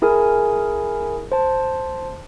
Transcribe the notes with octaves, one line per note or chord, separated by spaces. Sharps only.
E4 G#4 A#4 G#5
C5 A5